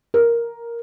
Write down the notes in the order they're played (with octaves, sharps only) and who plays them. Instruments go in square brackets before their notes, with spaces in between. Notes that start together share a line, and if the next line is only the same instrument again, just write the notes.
[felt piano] A#4